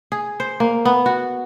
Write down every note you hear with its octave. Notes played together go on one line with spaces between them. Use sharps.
G#4
C5
A#3
B3
F#4